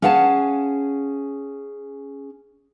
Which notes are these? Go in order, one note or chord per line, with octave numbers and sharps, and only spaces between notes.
C#4 G#4 F5 F#5 G#5 A5